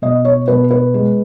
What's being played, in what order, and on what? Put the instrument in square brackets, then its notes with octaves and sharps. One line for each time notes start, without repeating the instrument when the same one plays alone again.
[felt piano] B2 D#5
C#5
B2 B4
B4
G#3